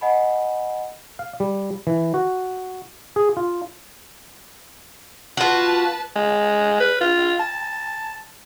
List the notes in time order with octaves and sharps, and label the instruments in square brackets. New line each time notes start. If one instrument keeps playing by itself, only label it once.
[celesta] D#5 F#5 G#5 B5
[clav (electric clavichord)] F5
G3
E3
F#4
G#4
F4
[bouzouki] F4 F#4 [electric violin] B4 A5
[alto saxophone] G#3
B4
F4
A5